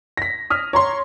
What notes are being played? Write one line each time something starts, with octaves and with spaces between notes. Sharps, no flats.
A#6 B6
D#6 F6 B6
C#5 A#5 C6